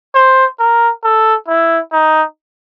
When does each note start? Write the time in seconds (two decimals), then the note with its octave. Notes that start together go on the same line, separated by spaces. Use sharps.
0.14 C5
0.59 A#4
1.04 A4
1.48 E4
1.92 D#4